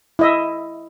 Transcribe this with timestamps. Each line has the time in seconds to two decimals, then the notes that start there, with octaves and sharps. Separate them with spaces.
0.19 E4 D#5 E5